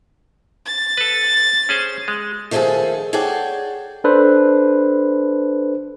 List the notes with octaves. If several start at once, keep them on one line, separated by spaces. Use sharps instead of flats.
A6
A4 B4
C#4 G#4 C5
G#3
D#3 F3 A3 C#4 G#4 A4
G#4 A4 C#5 D5 F#5 G5
D4 A4 B4 C5